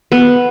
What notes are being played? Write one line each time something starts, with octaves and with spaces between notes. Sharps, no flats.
B3